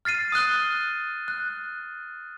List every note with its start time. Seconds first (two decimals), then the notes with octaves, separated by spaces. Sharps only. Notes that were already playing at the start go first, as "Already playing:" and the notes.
0.05 F6 A6 C7 D#7
0.32 D#6 F6 F#6 G7
1.28 F#6